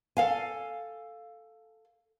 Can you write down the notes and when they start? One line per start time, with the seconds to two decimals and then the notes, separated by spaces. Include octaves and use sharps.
0.17 A4 F5 G#5